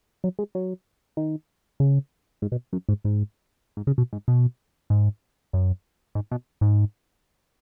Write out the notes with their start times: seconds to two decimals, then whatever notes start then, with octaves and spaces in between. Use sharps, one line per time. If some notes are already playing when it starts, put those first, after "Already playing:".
0.24 F#3
0.39 G#3
0.55 F#3
1.17 D#3
1.80 C#3
2.42 G#2
2.52 B2
2.73 F#2
2.89 G#2
3.04 G#2
3.77 G#2
3.87 C#3
3.98 B2
4.13 G#2
4.28 B2
4.90 G#2
5.53 F#2
6.15 G#2
6.31 B2
6.61 G#2